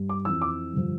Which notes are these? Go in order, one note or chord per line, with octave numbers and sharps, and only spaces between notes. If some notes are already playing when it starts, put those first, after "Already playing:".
Already playing: G2
D6
F2 E3 E6
D6
G2 D3 F3